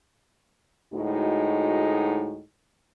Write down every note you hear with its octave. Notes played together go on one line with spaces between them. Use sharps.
D2 A2 G#3 D#4 F#4